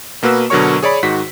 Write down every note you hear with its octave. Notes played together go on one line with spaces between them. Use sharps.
B2 A#3 F#4 B4 E6
B2 D3 F#3 A#4 C#5 C#6
G#4 C#5 D5 B5
G#2 D#3 F#4 B6